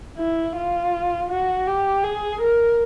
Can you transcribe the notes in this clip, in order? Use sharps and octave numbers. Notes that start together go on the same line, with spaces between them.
E4
F4
F#4
G4
G#4
A#4